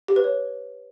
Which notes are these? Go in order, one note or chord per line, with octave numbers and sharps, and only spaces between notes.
G4
B4
C#5